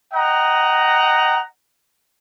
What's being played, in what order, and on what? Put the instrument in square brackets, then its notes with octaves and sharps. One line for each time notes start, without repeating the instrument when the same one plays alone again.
[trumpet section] D#5 F#5 G5 A#5